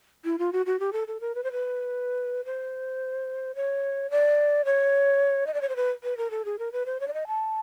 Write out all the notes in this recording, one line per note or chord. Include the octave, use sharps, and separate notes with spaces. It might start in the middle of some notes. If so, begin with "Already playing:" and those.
E4
F4
F#4
F#4
G4
A4
A4
A#4
B4
C5
B4
C5
C#5
D5
C#5
D#5
D5
C#5
C5
B4
B4
A#4
A4
G#4
A#4
B4
C5
C#5
D5
D#5
A5